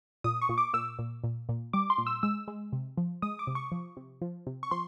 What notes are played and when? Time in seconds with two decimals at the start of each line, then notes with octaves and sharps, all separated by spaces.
0.24 A#2 D#6
0.41 C#6
0.49 A#2
0.58 D6
0.73 A#2 E6
0.99 A#2
1.24 A#2
1.49 A#2
1.73 G3 D6
1.90 C6
1.98 A#2
2.07 E6
2.23 G#3 E6
2.48 G#3
2.72 C3
2.97 F3
3.22 G#3 D#6
3.39 D6
3.47 C3
3.55 C#6
3.72 F3
3.97 C3
4.22 F3
4.47 C3
4.63 C#6
4.71 F3 C6